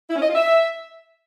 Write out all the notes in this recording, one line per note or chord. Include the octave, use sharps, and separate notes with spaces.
E4
C#4
D#5
F4
E5